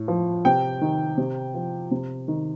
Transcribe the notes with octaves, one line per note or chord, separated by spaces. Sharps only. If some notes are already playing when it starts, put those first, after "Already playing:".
Already playing: A2
F3
C3 G5
D#3
C3
F3
C3
D#3